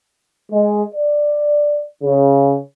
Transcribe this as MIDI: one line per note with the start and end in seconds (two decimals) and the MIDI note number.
0.52 0.83 56
0.95 1.84 74
2.04 2.58 49